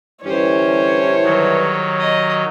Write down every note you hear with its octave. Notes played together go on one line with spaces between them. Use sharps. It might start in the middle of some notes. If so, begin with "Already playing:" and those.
G2 D3 E3 C#4 G4 C5 C#5
D#3 F#3
D#5